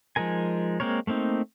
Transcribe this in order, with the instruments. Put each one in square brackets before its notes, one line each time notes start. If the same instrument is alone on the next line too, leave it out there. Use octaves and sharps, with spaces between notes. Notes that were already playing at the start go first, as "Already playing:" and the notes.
[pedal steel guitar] F3 G#3 D#4 A#4 G#5
G#3 A#3 C4 A#4 C#5
A3 A#3 C4 D#4